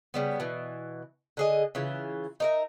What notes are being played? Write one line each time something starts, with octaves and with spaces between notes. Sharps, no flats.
C#3 G3 B3
B2 E3
D3 G#4 D#5
C#3 E3 F4
D#4 A#4 E5